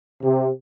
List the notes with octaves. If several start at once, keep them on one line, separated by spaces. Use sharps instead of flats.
C3